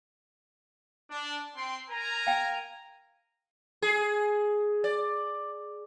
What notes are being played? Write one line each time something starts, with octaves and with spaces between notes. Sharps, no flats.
D4
C4 G5 C6
A#4 G#5 A#5
F5 G5
G#4
D5